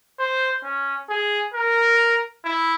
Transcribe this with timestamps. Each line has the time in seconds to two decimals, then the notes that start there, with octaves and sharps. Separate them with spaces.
0.19 C5
0.64 C#4
1.09 G#4
1.54 A#4
2.44 E4